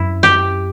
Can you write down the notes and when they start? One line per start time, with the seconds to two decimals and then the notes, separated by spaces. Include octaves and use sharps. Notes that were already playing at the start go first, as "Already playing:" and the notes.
Already playing: F#2 E4
0.23 G4